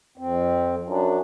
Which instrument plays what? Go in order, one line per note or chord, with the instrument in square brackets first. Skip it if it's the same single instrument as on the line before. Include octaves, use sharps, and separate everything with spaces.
[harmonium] F2 C4
[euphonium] F#2 [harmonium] D4